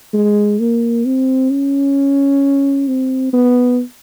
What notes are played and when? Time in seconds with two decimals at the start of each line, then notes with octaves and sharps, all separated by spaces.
0.14 G#3
0.60 A#3
1.06 C4
1.50 C#4
2.88 C4
3.33 B3